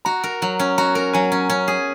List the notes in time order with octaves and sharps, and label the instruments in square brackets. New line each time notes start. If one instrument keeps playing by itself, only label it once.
[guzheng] F#4 [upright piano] A#5
[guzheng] A#4
F#3
C#4
[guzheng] F#4 [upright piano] A#5
[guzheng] A#4
[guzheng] F#3 [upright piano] G#5
[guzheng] C#4
C#4
G#4